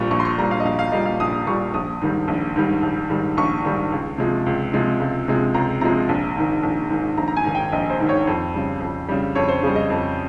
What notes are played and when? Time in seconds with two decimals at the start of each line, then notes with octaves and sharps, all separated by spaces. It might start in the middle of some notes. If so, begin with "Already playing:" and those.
Already playing: A#1 A#2 G3 C#6
0.11 A#1 C#6
0.20 C6
0.25 C#6
0.38 A#2 G3 A#5
0.51 F5
0.60 D#5
0.65 A#1 F5
0.79 F5
0.92 A#2 G3 D#5
1.06 F5
1.20 A#1 D#6
1.46 A#2 G3 C#6
1.74 A#1 D#6
2.01 G#2 D#3 G3
2.28 A#1
2.56 G#2 D#3 G3
2.82 A#1
3.10 G#2 D#3 G3
3.37 A#1 C#6
3.64 G#2 D#3 G3
3.92 C#2
4.18 C3 F3 G#3
4.46 C#2
4.73 C3 F3 G#3
5.00 C#2
5.28 C3 F3 G#3
5.54 C#2 A#5
5.81 C3 F3 G#3 A#5
6.09 A#1
6.37 G#2 D#3
6.63 A#1
6.90 G#2 D#3
7.17 A#1 A#5
7.28 A#5
7.37 G#5
7.45 G#2 D#3
7.55 G5
7.72 A#1 D#5
7.90 C5
8.00 G#2 D#3
8.09 C#5
8.27 F2 C5
8.54 C#3 G3
8.80 F2
9.08 C#3 G3
9.35 F2 C#5
9.48 C5
9.62 C#3 G3 G#4
9.76 D#5
9.90 F2